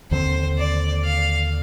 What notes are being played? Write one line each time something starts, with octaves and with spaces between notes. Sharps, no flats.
D#2 D3 G#3 C4 C5
D5
F5